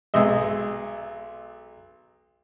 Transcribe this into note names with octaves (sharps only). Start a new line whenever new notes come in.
B1 G#3 D#5 E5